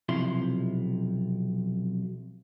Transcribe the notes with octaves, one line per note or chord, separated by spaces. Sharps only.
B1 C3 F3 E4 C6